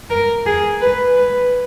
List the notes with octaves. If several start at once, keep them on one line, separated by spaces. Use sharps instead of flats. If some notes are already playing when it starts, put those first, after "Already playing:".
A#4
G#4
B4
B4